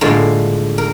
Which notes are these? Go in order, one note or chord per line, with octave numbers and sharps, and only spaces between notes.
A2 D3 G#3 A#3 F4
A#4